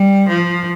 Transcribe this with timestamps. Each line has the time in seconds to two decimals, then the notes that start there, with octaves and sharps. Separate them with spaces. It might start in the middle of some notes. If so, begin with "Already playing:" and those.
Already playing: G3
0.28 F3